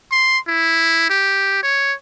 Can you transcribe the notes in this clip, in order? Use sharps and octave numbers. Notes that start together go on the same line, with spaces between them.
C6
E4
G4
C#5